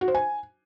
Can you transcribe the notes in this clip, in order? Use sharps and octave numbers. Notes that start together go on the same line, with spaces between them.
F#4
C5
G#5